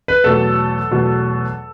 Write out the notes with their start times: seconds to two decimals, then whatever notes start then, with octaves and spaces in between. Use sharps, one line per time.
0.08 B4
0.24 E2 B2 F#3 A3 A4
0.91 E2 B2 F#3 A3